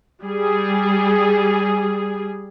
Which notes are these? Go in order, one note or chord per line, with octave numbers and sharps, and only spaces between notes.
G3 G#4